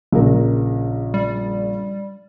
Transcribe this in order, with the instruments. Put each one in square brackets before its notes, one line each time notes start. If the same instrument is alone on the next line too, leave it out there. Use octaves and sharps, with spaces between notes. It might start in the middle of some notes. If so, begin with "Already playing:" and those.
[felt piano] A#1 C#3 A#4
[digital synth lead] G3